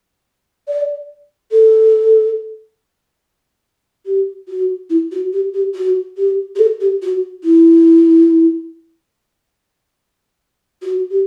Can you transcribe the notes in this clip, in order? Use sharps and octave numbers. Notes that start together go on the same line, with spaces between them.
D5
A4
G4
F#4
E4
F#4
G4
G4
F#4
G4
G4
A4
G4
F#4
E4
F#4
G4